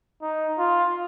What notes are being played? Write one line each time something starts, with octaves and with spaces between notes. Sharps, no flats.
D#4
F4